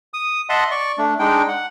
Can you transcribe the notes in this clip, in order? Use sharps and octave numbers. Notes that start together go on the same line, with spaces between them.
D#6
D#5 E5 F#5 A5 C6
D5 C#6
A3 D4
G#3 D4 D#4 G5
F#5